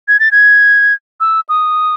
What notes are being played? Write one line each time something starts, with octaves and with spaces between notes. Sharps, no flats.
G#6
A6
G#6
E6
D#6